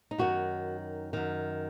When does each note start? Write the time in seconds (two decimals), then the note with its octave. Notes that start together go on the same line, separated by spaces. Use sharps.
0.11 D#4
0.18 F#2 D#3 F#4
1.13 F#2 D#3